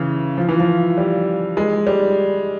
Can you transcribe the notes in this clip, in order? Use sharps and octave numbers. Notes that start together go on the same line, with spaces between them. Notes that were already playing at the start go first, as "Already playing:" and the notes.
Already playing: C#3 E3
F3
E3
F3
G3
G#3
G3